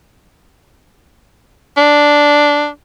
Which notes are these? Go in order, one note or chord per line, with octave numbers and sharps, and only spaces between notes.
D4